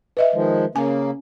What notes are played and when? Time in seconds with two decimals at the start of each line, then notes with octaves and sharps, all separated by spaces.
0.17 B4 D#5 E5
0.34 D#3 F3 G#3
0.75 C#3 A#3 C#4 G#5